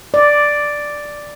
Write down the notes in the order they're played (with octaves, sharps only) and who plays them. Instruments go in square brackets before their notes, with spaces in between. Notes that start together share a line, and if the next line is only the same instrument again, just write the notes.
[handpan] D5